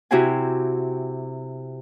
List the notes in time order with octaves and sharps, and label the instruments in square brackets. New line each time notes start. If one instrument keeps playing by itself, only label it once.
[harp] C3 E4 F#4 G4 C5 G#5